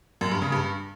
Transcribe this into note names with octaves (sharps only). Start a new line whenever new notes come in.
F#2
G2
C#3
G2